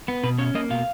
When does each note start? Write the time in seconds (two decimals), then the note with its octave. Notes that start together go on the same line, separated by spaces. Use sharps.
0.08 B3
0.23 B2 B4
0.38 C#4 C#5
0.55 A#3 D#5
0.70 B2 F5